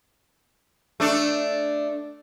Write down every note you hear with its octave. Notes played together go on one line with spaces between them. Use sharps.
A3 D4